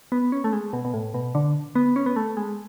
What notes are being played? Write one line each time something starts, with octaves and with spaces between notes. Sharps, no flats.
B3
C#4
A3
G#3
B2
B2
A2
B2
D3
B3
C#4
B3
A3
G#3